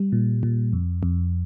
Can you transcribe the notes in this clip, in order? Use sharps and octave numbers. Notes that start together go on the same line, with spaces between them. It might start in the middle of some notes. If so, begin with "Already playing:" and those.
Already playing: G3
A#2
A#2
F2
F2